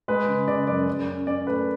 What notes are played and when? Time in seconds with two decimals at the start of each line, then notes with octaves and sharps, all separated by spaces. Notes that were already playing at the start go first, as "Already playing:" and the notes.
0.08 G#3 B4
0.28 C#3
0.48 C#3 D5
0.67 F#2 D5
0.87 F#2
1.07 C#4
1.27 C#4 D5
1.47 A3 B4